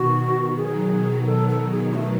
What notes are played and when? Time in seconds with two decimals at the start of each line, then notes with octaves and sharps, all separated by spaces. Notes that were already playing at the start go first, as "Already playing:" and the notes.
Already playing: B2 D#3 F#4
0.56 D#3 F#3 G#4
0.91 B2 D#3
1.25 B2 A4
1.48 A4
1.71 G#4
1.94 A3